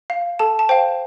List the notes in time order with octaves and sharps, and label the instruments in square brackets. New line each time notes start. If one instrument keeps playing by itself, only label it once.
[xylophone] F5
A4 A5
A5
C5 F5 G5